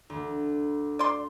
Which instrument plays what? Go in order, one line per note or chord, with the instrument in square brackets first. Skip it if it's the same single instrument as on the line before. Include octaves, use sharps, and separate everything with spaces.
[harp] D2
[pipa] D5 C6